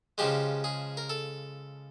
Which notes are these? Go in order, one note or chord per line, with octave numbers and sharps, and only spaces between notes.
C#3 F3 G#3 G4
G#4
A#4
A4